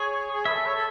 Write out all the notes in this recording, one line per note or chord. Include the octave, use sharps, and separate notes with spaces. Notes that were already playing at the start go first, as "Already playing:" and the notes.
Already playing: G#4 C#5
G#4
A4 B4 E5
C#5
A4